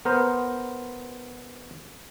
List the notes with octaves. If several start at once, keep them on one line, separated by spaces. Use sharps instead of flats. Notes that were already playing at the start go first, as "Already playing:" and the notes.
B3 A#4 C5